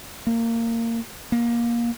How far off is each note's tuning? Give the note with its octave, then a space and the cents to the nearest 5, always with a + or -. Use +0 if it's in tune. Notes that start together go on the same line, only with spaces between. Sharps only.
A#3 -20
A#3 +20